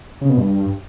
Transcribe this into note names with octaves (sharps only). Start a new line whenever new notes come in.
C#3
B2
G2